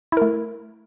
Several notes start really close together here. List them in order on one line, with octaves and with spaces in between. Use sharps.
E4 A#4 A3